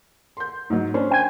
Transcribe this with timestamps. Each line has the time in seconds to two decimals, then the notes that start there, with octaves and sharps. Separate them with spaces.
0.37 C6 G6
0.70 G#2 F#3
0.94 C#4 D4 C5
1.11 G5 G#5